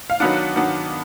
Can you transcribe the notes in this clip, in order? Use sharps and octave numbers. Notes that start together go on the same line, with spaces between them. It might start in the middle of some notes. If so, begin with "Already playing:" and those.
F5
D#3 F#3 B3 D4 F#5
D#3 F#3 B3 D4